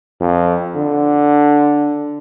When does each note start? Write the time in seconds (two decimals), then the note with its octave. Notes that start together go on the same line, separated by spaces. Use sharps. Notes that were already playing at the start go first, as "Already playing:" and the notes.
0.21 F2
0.75 D3